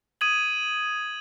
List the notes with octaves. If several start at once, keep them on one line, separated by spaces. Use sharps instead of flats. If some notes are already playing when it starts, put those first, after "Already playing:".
D#6 G#6 D#7 F#7